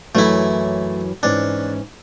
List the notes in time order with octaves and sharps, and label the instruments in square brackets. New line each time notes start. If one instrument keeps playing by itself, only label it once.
[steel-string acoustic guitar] F#2 E3 F#3 [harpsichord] A3 E4
[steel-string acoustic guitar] G#2 E3 C#4 [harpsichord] D4